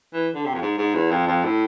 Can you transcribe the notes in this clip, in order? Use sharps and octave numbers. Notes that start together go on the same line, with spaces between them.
E3
D3
C3
F2
G#2
G#2
E2
F2
F2
A2